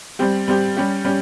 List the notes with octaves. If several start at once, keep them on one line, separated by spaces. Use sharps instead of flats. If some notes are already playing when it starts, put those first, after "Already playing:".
G3 C4 G4
G3 C4 G4
G3 C#4 G4
G3 C#4 G4